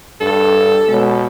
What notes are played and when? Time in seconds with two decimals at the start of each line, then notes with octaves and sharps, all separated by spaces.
0.21 G2 A4
0.88 B2 G#3 C#5